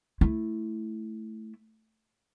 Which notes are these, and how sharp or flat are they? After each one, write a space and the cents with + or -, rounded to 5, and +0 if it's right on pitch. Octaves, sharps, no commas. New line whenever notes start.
A3 +0 E4 +0